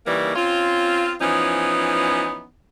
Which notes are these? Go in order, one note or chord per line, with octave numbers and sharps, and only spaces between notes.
C#3 E3 G3 A#3 D#4
C4 C#4 F4
E3 F3 B3 C#4 D#4